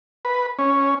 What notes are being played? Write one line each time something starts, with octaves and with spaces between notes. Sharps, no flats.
B4
C#4